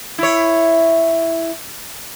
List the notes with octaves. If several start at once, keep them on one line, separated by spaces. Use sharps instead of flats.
E4 C#5